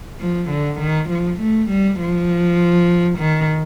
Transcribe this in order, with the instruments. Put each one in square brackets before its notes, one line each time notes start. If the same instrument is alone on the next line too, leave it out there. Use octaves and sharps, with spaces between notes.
[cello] F3
D3
D#3
F3
A3
G3
F3
D#3